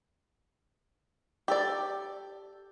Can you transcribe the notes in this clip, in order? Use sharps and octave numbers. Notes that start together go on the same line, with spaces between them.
G4 A4 D5